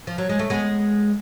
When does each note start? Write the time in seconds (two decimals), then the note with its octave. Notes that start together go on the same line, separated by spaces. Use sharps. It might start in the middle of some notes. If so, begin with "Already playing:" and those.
0.07 F3
0.18 F#3
0.29 G#3
0.39 A3
0.50 G#3 B3